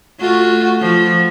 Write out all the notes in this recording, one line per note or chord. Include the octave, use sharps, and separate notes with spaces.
A3 F4 F#4
F3